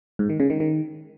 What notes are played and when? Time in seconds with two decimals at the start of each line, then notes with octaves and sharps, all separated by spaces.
0.19 G#2
0.29 D#3
0.40 C#3
0.50 D#3
0.60 D#3